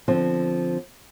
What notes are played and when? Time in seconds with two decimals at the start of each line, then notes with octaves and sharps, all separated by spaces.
0.08 D3 F3 C4